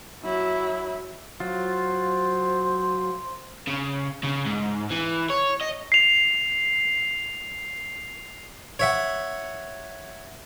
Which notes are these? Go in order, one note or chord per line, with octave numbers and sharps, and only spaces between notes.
F#3 E4
F#3 F4 C5
C#3
C#3
G#2
E3
C#5
D#5
C7 F7
C#5 E5 F#5